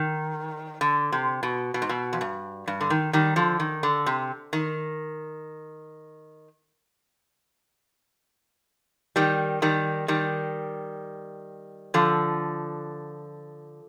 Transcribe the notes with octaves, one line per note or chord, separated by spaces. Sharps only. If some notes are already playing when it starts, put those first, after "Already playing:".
Already playing: D#3
D3
C3
B2
B2
G#2
B2
F2
G2
G2
D3
D#3
D#3 G3
D3 F3
D#3
D3
C3
D#3
D#3 G3
D#3 G3
D#3 G3
D3 F3